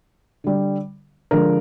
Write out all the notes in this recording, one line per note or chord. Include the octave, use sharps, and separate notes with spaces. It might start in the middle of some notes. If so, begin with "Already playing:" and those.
D3 G3
D3 F3 G#3 A#4